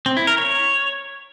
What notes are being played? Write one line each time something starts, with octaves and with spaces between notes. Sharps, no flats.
C4
E4
A#4
C#5